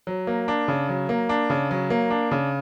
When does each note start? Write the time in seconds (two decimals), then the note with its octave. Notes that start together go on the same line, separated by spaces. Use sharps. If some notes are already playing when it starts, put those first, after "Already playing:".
0.07 F#3
0.27 A#3
0.48 D4
0.68 C#3
0.89 F#3
1.09 A#3
1.29 D4
1.50 C#3
1.71 F#3
1.90 A#3
2.10 D4
2.31 C#3